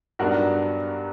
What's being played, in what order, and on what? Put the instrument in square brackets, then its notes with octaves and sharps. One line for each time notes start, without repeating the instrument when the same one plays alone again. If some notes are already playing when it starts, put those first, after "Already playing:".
[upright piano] G2 F#3 B3 D4 F#4 A#4